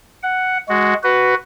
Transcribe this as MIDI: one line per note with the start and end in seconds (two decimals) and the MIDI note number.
0.23 0.58 78
0.69 0.94 56
0.69 0.94 66
1.04 1.34 66
1.04 1.34 71